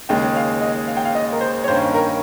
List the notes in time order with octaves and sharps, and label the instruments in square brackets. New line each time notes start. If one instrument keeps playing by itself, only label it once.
[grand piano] D#2 C#3 G#3 [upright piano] G5
[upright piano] F5
D#5
F5
G5
F5
D#5
A#4
C5
C#5
[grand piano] G2 D#3 A#3 C#4 [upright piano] C5
[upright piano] A#4